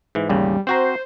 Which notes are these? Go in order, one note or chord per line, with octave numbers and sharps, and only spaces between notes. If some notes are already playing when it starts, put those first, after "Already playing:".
G#2 E3
A1 D#2 C#3 G3
C4 F#4 C5 A#5